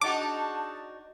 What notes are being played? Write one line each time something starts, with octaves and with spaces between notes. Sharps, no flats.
D4 D#4 F#4 G#4 F#5 A5 D6